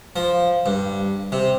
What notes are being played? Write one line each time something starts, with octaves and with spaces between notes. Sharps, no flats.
F3
G2
C3